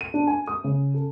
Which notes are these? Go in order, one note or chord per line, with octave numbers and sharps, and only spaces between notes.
D#7
D4
G#5
D#6
C#3
A4